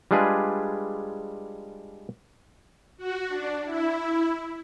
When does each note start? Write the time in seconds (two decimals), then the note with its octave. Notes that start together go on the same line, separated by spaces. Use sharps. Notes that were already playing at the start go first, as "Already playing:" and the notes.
0.11 G3 G#3 D4 F4 G#4 B4
2.97 F#4
3.28 D4
3.65 E4